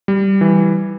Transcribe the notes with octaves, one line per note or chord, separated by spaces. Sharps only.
G3
E3